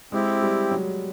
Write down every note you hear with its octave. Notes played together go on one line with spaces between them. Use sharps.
G#3 C4 E4 G4
G3
F#3